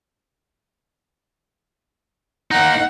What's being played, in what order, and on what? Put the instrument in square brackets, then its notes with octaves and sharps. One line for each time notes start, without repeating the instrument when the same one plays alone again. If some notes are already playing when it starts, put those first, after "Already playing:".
[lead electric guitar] A#3 D#4 [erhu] F#5